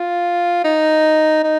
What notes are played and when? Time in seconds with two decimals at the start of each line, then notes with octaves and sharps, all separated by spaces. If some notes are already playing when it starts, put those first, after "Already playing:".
Already playing: F4
0.64 D#4
1.43 D#4